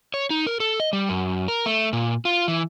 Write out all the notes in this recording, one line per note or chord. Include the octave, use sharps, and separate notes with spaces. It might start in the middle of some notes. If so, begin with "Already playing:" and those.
C#5
D#4
A#4
A4
D#5
G3
F#2
A#4
A3
A#2
F4
E3